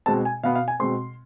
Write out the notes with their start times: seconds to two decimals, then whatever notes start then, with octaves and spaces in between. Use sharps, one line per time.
0.06 B2 G#3 C4 A5
0.25 G#5
0.43 B2 B3 F5
0.55 F5
0.68 G#5
0.80 B2 G#3 C4 C6